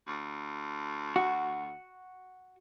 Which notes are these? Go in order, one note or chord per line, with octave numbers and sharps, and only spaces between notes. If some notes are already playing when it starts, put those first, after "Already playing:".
D2
F#4